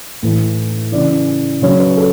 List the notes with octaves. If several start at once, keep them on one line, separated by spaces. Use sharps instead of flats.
A2 E3
C#3 E3 D5
C#3 F#3 C#5
B4
A4